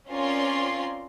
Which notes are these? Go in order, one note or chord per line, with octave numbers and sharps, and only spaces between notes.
C4 C#4 F4 A#4 D5 C6